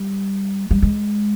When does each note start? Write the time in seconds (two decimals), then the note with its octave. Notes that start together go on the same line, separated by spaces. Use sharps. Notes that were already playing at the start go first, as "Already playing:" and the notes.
Already playing: G3
0.71 G3
0.82 G#3